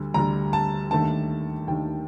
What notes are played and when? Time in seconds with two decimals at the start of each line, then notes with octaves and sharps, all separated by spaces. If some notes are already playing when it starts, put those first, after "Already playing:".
Already playing: D2 D3 G3
0.14 D2 D3 G3 A#5
0.53 A5
0.91 D#2 D#3 A3 D4 A5
1.67 D#2 D#3 A3 D4 G5